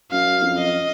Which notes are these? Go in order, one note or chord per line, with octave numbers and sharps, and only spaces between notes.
F#2 F5
F2
D#5